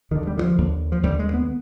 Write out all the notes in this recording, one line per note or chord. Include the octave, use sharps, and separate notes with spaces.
D#2 D3 D#3
G3
D#3
F3
D#2 D3
F3
D#2 D3 G3
G#3
B3